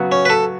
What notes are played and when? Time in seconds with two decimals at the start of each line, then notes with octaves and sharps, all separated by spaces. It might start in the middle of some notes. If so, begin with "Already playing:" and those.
Already playing: C#3 F#3 B3 F#4
0.12 C#4
0.25 B4
0.30 A4